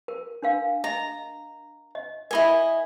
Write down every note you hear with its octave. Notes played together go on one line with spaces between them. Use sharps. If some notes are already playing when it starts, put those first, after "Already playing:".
A#4
D4 A#4 F5
D#5 A#5
D#5
E4 A#4 D#5 G#5 B5